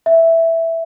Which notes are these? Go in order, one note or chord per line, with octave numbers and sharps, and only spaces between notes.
E5